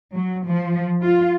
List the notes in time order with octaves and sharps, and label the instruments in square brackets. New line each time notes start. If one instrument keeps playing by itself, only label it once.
[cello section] F#3
F3
F4